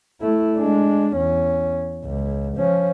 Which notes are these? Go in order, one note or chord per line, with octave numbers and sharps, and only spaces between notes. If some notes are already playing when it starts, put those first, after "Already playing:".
A3 E4
G#3 D4
E2 C#4
C#2
F3 C#4